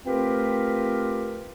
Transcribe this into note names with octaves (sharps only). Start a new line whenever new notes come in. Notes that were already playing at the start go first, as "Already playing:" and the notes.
A3 C4 F4 G4 A#4 B4